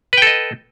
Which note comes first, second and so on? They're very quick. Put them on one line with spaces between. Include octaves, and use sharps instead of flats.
B4 G5 A4 D#5